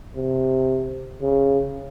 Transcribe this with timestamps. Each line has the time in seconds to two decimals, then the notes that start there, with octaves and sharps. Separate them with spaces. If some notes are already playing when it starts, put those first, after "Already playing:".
0.16 C3
1.21 C#3